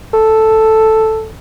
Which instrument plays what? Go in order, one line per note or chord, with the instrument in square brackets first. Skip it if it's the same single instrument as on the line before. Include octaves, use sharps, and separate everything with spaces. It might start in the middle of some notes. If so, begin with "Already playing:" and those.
[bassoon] A4